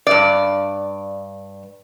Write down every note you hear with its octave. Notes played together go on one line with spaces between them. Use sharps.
G2 D5